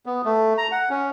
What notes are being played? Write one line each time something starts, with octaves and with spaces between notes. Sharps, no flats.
B3
A3
A#5
F#5
C#4